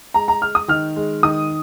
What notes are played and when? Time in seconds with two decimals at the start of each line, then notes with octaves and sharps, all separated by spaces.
0.14 G#3 A#5
0.28 A#5
0.42 G#3 F6
0.55 D#6
0.68 D#3 F6
0.96 G#3
1.23 D#3 D#6